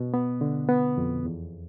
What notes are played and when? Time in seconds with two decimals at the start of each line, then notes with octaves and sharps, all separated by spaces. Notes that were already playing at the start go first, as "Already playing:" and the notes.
Already playing: B2
0.14 B3
0.41 D3
0.69 B3
0.98 F2
1.25 E2